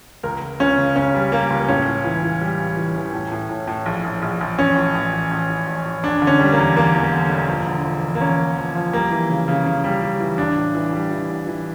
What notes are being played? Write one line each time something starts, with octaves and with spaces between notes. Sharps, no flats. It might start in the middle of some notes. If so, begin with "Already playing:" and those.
C#2 A#4
C#2
C#2 C#4
C#3
C#3 C#4
G3
G3 A#3
C#2
A2 C#4
A2
E3
E3
G3
A1
E3
E3
A2
A2
A2
A2
A#1
A#1
A#1
A#1
A1 C#4
A2
A1
A1
A1
A1
A1
A1
E1 D4
D3
C#4
G3
A#3
E2
E2 A#3
E2
D3
E1
F3
D3
F3
E2
A#3
E2 C#4
E1
F3
F3
G3 A#3
E3
C#3
C#3
C#3
G3
G3
E3
A1 D4
A2
E3
G3
E3
A1
E3